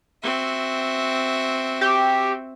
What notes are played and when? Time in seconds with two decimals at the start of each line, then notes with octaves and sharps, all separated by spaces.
0.23 C4 F#4 E5
1.81 G4